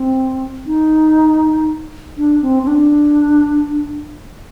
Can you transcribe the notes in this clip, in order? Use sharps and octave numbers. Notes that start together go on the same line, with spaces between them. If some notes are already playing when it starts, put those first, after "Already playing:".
Already playing: C4
D#4
D4
C4
C4
D4